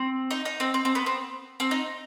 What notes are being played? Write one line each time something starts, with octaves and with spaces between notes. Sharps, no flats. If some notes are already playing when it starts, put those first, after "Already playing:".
Already playing: C4
D#4
D#4
C4
C4
C4
B3
C4
C4
D#4